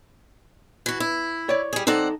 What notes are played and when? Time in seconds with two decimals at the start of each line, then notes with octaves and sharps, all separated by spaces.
0.86 E3 F#4
1.00 E4
1.49 C#5 D5
1.73 G3 G#4
1.87 C4 D#4 A4 D5 F#5